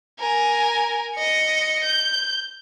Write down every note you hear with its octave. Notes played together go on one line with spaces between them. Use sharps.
A#4 G#5
D#5 C#7
G6